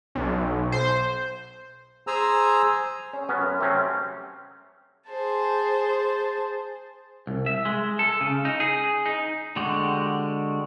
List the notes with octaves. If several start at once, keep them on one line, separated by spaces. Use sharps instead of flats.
B1
C5
G#4 C5 G#5 A#5 E6
C#4
F#3 B3 C#4 F#4 B4
F#2
C3 F#3 A3 C4 C#4
G#4 C5 A5
C2
E5
G#3
A4
C#3
D#4
G#4
D#4
D3 G#3 F#4 G4